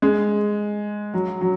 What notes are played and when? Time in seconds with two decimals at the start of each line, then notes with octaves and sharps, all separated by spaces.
0.02 G#3
1.14 F#3
1.41 F#3